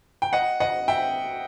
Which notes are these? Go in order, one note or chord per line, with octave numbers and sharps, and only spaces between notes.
G5
D#5 F#5
D#5 F#5
E5 G5